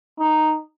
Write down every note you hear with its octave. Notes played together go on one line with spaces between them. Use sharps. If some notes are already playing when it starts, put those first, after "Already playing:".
D#4